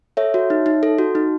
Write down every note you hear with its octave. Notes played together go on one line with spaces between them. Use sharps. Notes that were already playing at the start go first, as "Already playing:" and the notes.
A4 C#5 E5
F#4
D#4
D#4
A4
F#4
D#4